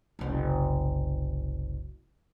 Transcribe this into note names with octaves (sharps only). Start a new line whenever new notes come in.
F#1 C2